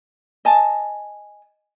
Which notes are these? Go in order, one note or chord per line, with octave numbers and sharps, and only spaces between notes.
D#5 G#5 A5